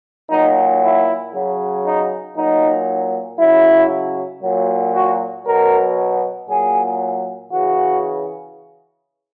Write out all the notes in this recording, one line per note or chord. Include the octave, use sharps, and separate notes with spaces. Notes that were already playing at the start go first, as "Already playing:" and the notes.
A#2 F#3 D#4
E4
C#3 F#3
D#4
A#2 F#3 D#4
C#3 F#3 E4
A#2 F#3
F#4
B2 F#3 A#4
A#2 F#3 G#4
C#3 E3 F#4